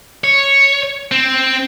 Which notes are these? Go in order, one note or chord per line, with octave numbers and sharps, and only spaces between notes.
C#5
C4